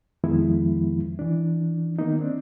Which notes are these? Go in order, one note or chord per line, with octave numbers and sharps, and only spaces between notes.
F2 D#3 F3 G#3 B3 E4
E3 D4
D#3 A#3 B3 D#4
C4 D4